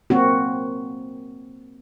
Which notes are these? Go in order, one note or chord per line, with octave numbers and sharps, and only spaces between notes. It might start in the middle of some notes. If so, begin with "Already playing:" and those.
A#3 C4 F#4